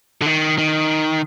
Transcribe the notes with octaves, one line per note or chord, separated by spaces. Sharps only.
D3
D#3
D#3